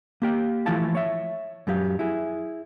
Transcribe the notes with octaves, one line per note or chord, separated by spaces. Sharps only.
A#3 G4 G5
E3 F3 A3 E4 F5 A5
C#5 E5
F#2 F#3 G4 F5
E4 G#4